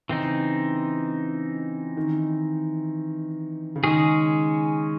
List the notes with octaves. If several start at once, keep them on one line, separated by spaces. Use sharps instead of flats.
C#3 E3 C4 D#4
D#3
C#3
D#3 G#3 C#4 G#4